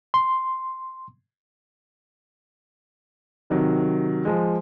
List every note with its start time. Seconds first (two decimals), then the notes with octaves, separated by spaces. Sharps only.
0.14 C6
3.50 C3 D#3 F#3
4.25 F3 G#3